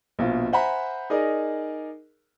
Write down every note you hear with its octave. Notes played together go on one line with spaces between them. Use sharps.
A#1 B2 F4
C5 E5 F#5 G#5 A#5 B5
D#4 G#4 A#4 D5 D#5